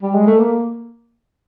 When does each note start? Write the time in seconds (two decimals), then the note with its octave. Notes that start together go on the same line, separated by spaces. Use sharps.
0.03 G3
0.15 G#3
0.27 A3
0.39 A#3